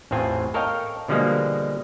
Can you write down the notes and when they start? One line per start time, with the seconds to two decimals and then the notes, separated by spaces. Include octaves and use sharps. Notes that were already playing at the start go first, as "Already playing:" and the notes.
0.11 A1 E2 A2 C4 F4 G#5
0.54 A4 A#4 C#5 D#5 F5 G5
1.08 B2 D3 F3 G3 G#3 A#3